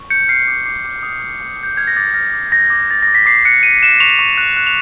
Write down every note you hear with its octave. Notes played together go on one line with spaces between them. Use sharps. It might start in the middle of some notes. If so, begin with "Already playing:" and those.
Already playing: C#6
G6 C#7
F6 C7
D6
D6 C7
D6
D#6
G6
G6
D#6 G6
F6 G#6
A#6
D6 A6
F6 A#6
D6
G6 A#6
D6
D6 A6
A#6
D6
B6
D6 C7
F#6 C#7
F#6 D#7
F#6 E7
C#6 F7
C#6
F#6
F#6
F7